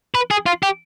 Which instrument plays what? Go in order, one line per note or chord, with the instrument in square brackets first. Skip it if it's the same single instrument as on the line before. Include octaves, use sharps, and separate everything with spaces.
[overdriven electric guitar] B4
G#4
F4
G4